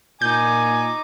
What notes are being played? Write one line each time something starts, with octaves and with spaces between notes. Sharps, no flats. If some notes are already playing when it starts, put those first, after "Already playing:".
A#2 D#4 G#5 D6 G6